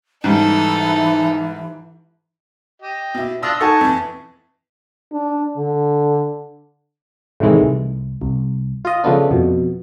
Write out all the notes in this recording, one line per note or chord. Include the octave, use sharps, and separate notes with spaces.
G#2 E3 G3 D#4 A4
G4 D#5
B2 E4
D4 F4 D#6 E6 A#6
D#4 A4 F#5 G#5 A5 C#6
F2 E3
D4
D3
A2 C3 D#3 E3 G#3
C2
C2
F4 D#5
C#3 F3 A3 B3 D4
F2 B2